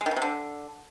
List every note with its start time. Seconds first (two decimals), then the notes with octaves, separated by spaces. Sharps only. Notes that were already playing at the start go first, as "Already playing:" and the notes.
0.01 G#3
0.06 D#3
0.11 C#3
0.16 C3
0.22 D3